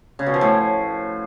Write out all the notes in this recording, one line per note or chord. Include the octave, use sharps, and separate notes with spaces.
C#3
B2
F3
A2